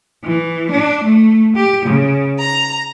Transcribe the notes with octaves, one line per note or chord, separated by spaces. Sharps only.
E3
D4
A3
G4
C#3
A#5